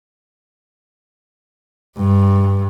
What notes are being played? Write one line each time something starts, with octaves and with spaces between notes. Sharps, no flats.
G2